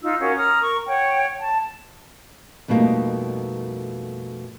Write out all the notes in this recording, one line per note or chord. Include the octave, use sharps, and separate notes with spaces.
D#4 F4 E6
C#4 F#4 A#4 F5
A#5 D#6 F6
A#4 C#6
C#5 F#5 G5
A5
F2 B2 G3 A3 A#3 D#4